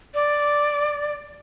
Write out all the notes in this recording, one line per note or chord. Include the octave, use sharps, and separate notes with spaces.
D5